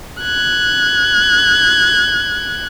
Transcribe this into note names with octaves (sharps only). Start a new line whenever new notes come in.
F#6 G#6